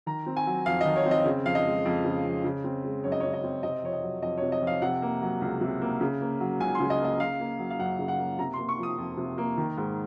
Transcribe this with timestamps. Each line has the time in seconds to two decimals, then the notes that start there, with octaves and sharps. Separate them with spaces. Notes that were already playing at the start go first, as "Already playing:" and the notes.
0.06 D#3 A#5
0.26 C4
0.37 G#5
0.46 F#3
0.66 F2 F5
0.81 D#5
0.85 D#3
0.96 C#5
1.06 C4
1.11 D#5
1.25 C#3
1.45 F2 F5
1.55 D#5
1.65 G#3
1.85 F2
2.04 C#3
2.24 F2
2.44 C#3
2.64 C4
2.84 G#3
3.04 F#2 C#5
3.12 D#5
3.20 C#5
3.24 C#3
3.33 D#5
3.44 C4
3.63 C3 D#5
3.83 F2 C#5
3.93 D#5
4.03 F#3
4.22 F2 D#5
4.38 C#5
4.42 C3
4.52 D#5
4.62 F2
4.67 F5
4.82 C3 F#5
5.02 A#3
5.22 F#3
5.41 C#2
5.61 C3
5.81 A#3
6.01 C#3
6.21 A#3
6.40 F#3
6.60 C#2 G#5
6.75 C6
6.80 C#3
6.90 D#5
7.00 A#3 D#5
7.19 C#3 F5
7.40 A#3
7.59 F#3
7.70 F5
7.79 F#2 F#5
7.99 C#3
8.08 F#5
8.18 A#3
8.38 C3 A#5
8.54 C6
8.58 A#3
8.69 C#6
8.78 F3
8.83 D#6
8.98 F2
9.17 C3
9.38 A#3
9.57 D#3
9.77 G#2